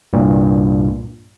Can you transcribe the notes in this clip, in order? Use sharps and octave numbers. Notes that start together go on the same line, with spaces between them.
C2 G2 A#2